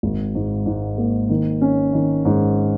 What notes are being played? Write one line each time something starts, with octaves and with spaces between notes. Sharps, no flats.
G#1
G#2
G#2
A#3
D#3
C#4
D#3
G#2